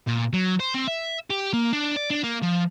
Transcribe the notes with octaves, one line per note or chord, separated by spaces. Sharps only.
A#2
F#3
C5
C4
E5
G4
A#3
D4
D5
D4
A#3
F3